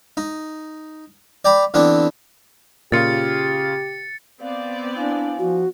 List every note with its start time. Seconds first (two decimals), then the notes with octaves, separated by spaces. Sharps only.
0.17 D#4
1.45 D5 G5 A#5 B5
1.74 D3 E3 B3 C4 D4
2.92 A#2 C#3 F4 G4 A6 C#7
4.41 B3 C4 D5 F5
4.96 D4 E4 F5 G#5
5.39 F3 F#4